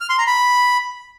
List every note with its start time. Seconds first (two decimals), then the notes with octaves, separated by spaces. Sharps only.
0.01 F6
0.10 C6
0.18 A#5
0.27 B5